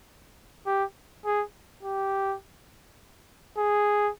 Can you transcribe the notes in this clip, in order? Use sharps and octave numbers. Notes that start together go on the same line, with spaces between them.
G4
G#4
G4
G#4